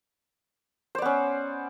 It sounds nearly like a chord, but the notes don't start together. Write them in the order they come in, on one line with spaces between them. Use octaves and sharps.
C5 D5 B3 C#4